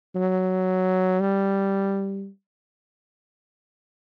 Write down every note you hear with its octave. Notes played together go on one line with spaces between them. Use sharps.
F#3
G3